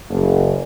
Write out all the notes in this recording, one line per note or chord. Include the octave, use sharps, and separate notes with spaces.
F#1